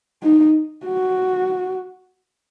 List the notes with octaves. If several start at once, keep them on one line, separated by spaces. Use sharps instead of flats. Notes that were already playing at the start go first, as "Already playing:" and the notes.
D#4
F#4